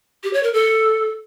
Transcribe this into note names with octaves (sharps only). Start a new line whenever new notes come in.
G4
C#5
A#4
A4